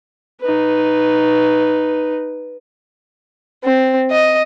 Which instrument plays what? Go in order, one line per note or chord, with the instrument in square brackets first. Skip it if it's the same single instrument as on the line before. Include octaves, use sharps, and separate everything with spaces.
[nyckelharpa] D#4 B4
[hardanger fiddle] C4
D#5